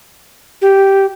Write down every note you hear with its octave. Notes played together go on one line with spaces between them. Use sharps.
G4